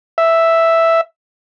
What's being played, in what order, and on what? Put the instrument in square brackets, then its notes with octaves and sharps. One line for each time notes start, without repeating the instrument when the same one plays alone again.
[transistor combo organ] E5